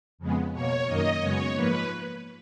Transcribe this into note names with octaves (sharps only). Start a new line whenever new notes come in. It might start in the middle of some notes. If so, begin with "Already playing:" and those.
F2 C#3 G#3 B3
B2 A#3 C#5
F#2 D#3 A#3 D#5
F#2 C#3 G#3 B3 C#5
G#2 F3 A#3 B4